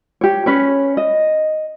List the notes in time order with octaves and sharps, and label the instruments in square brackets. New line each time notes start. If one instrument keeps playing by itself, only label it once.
[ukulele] G4 C#5
C#4 B4 C#5
D#5